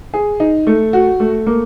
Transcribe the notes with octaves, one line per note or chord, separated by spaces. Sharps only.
G#4
D#4
A3
F#4
A3
A#3